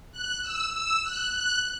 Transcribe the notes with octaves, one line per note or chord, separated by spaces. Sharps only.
F#6
E6
E6
F#6
F#6